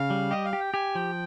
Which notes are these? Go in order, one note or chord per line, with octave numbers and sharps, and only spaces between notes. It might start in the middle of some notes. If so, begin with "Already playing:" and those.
Already playing: C#3 F5
G3
G4 D#5
F5
G4
G5
G4 G#5
F3 G5